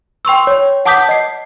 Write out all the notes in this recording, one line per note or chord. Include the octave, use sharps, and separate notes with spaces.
G5 C6 C#6 E6
C#5
F#5 A5 D6 D#6 G6 B6
D#5 C7